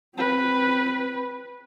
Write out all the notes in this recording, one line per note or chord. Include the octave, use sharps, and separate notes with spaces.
C4 B4